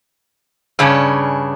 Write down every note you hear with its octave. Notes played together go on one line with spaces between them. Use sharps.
G2 C#3 C#4 D4